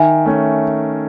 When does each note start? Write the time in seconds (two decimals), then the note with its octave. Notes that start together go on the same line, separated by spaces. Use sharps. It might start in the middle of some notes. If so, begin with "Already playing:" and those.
Already playing: D#3 E5 G#5
0.26 A3 C#4